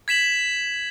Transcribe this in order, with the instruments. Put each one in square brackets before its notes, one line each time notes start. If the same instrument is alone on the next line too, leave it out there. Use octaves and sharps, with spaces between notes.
[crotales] G#6 B6 E7 F#7